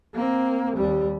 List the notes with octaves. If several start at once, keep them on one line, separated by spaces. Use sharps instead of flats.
A#3 C4
D#2 G3